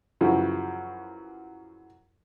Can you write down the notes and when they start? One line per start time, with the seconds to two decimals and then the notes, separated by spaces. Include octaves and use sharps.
0.21 F#2 C#3 E3 F3